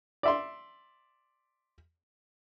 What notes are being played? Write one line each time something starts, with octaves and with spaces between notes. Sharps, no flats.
D5 E5 C6